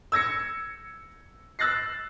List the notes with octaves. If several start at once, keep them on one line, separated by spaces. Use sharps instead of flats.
E6 G#6 A#6 C#7
E6 F#6 A6 A#6 C7